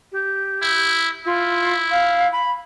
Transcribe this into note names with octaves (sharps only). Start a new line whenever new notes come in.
G4
E4
E4 F4
F5
B5